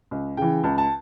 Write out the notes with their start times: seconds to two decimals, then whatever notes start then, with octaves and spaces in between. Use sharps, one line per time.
0.11 C#2
0.37 C#3 E3 G5
0.64 C#2 A5
0.78 A5